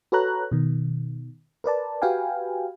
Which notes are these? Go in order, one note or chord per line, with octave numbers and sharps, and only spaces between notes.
F#4 A4 B4 C#5 A#5 F#6
B2 D#3
A#4 B4 D5 A5
F#4 G4 B4 F5 G5 G#5